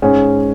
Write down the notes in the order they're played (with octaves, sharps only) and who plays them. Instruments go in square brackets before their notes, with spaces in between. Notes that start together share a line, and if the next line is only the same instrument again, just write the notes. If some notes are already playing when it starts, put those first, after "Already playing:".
[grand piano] G#2 G#3 C#4